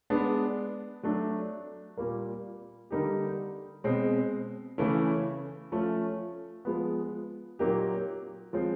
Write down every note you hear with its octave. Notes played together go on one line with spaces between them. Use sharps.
G#3 B3 D4
F#3 A3 D4
A#2 G3 A#3
D3 G3 A#3 D#4 G4
B2 G#3 C4
C#3 E3 A3 C#4 E4
F3 A3 C#4
F3 G#3 B3
A#2 F#3 A#3 D#4 G4
F3 G#3 C4